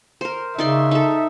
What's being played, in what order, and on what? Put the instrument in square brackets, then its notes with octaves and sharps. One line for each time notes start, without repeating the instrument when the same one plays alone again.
[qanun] A#4 C5
[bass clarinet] C#3 [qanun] D#4 D5 C6 [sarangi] E5
[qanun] D#4 A4